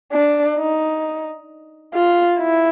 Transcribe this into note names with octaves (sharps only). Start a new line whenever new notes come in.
D4
D#4
F4
E4